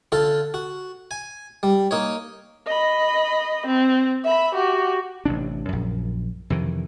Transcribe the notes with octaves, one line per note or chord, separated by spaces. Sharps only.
D3 F4 A4
F#4
G#5
G3
A#3 D#4 C#5
D#5 B5
C4
E5 B5
F#4 G4
A1 C3 D4
A#1 F#2
F2 C3 D#3 E3